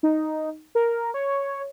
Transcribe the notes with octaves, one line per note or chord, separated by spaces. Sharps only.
D#4
A#4
C#5